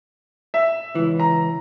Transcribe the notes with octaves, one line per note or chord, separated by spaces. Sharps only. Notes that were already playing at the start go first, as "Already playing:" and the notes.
E5
C#2 E3
A#5